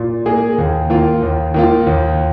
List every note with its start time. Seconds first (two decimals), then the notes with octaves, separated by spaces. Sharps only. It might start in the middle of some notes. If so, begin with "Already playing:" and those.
Already playing: A#2
0.26 A#3 G#4
0.58 D#2
0.90 D#3 A#3 F4
1.22 D#2
1.54 D#3 A#3 F4
1.87 D#2